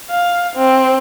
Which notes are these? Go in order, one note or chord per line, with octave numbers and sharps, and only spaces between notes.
F5
C4